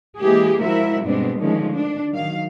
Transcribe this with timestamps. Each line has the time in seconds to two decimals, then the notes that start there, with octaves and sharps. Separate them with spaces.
0.18 E3 G#3 A#3 G4 G#4
0.61 F3 G#3 E4 F#4 A#4 E5
1.04 G2 B2 G#3 B3 C4 D4
1.39 D3 D#3 F3 G#3 A3 C#4
1.74 D4
2.12 D#3 F#3 F5